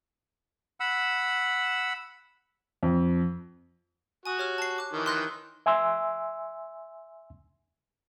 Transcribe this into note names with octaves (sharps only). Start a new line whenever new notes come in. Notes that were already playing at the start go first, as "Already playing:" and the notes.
F#5 B5 E6
F2
F#4 G#5 D#6
G4 C#5 F6
A5 C7
D6 F#6
D#3 E3
C6 F#6 A#6
E5 G#5 C6 E6